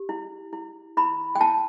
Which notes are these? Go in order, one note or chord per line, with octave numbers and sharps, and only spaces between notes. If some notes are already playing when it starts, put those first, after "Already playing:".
Already playing: G4
E4
E4
E4 B5
G5
E4 A5